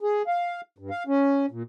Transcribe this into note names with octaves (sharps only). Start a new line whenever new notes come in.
G#4
F5
G2
F5
C#4
A#2